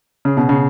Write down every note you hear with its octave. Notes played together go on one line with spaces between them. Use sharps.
C#3
B2
C#3